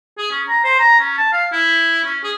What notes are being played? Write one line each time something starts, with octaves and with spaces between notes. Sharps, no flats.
G#4
C#4
A#5
C5
A#5
C#4
A5
F5
E4
C#4
G#4